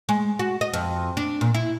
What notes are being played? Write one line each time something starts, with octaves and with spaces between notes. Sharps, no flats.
G#3
F#4
D#5
F2
D4
A#2
E4